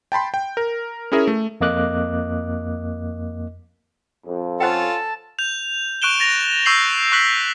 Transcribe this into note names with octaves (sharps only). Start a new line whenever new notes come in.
G5 A5 B5 C6
G5
A#4
C#4 E4 G#4 A#4 E5
A3
F2 A#3 D#5 D6 F#6
F2
C#4 F4 A4 C5 F#5 G5 A5
G6 F7
C#6 F#6 D7 E7 G7
A6 A#6 F7
C#6 E6 G6 C7 F#7
C#6 F#6 B6 F#7